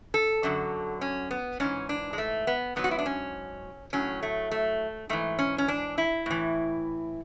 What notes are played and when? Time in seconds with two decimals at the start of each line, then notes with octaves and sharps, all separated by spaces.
0.14 A4
0.43 F#2 D3 F#3
1.01 C#4
1.31 B3
1.60 G#2 E3 C#4
1.89 D4
2.13 G#3
2.18 A3
2.47 B3
2.76 G#2 F#3 B3
2.84 F#4
2.91 E4
2.99 D4
3.06 C#4
3.93 A2 F#3 C#4
4.23 A3
4.51 A3
5.09 G#2 E3 A3
5.39 C#4
5.58 C#4
5.68 D4
5.98 E4
6.26 A2 E3